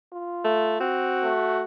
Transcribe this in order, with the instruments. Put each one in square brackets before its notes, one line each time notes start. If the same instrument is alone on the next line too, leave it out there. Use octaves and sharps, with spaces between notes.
[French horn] F4
[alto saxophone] A3
[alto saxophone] C4 [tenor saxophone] F#4
[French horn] A3